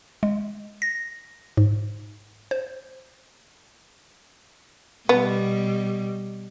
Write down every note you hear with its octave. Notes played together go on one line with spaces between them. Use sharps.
G#3
A#6
G#2
C5
B2 G3 B3